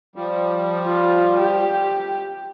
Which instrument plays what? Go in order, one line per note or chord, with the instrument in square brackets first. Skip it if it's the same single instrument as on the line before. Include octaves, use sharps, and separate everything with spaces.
[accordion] F3 G3
[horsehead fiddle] F4
G4